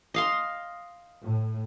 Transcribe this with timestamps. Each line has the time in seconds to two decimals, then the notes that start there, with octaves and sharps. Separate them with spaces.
0.14 D#5 F5 C6
1.24 A2